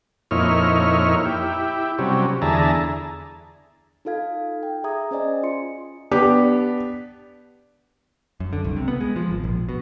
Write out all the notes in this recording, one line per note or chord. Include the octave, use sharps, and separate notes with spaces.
F2 A#2 D#4 E4 C#5 F6
E4 G4
C3 F#3 G3 C#4
E2 D3 G#4 E5 A5 A#5
D#4 F4 A4 F5 G#6
G5
G#4 E5 A#5 D#6 G#6
C#4 C5 D5 D#5 G#5
F4 C6 C#7
B3 D4 G4
F#2
D3
C2
C3
B3
G#3
F3
G#1
A#1
B2